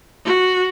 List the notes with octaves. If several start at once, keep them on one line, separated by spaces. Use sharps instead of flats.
F#4